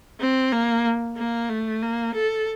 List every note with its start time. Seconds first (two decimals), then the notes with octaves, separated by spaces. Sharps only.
0.21 C4
0.52 A#3
1.18 A#3
1.49 A3
1.82 A#3
2.15 A4